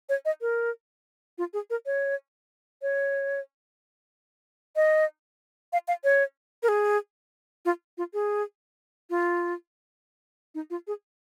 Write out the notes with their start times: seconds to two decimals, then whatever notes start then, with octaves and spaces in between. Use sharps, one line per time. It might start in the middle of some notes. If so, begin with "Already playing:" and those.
0.09 C#5
0.25 D#5
0.41 A#4
1.38 F4
1.53 G#4
1.70 A#4
1.86 C#5
2.82 C#5
4.76 D#5
5.73 F5
5.88 F5
6.04 C#5
6.63 A#4
6.68 G#4
7.65 F4
7.98 F4
8.14 G#4
9.10 F4
10.55 D#4
10.70 F4
10.87 G#4